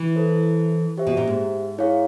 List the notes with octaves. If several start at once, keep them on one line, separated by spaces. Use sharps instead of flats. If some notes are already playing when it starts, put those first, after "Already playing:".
Already playing: E3
E4 A4 C5
G4 C5 E5
B2
A#2
G#2
E4 G#4 C#5 F5